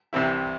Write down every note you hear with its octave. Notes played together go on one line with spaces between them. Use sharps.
C2 C3 E3 C4 E4